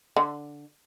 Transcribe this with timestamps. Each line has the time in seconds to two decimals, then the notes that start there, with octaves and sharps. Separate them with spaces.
0.16 D3